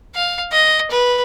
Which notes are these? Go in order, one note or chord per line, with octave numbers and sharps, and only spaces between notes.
F5
D#5
B4